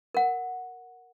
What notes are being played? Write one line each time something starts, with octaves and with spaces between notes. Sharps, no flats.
A#4 F#5